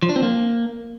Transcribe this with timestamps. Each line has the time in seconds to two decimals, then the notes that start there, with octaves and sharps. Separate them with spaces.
0.03 F3
0.09 D4
0.16 C4
0.23 A#3